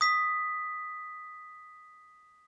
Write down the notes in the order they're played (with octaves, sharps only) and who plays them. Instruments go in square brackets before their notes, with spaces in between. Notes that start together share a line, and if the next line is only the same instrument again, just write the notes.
[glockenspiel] D#6 B6